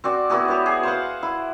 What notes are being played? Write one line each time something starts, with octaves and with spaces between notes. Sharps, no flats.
C4 F#4 D5
B3 E4 F#4 G#4
F#4 G4 B4 C#5
G#4
C5 F5 F#5
E4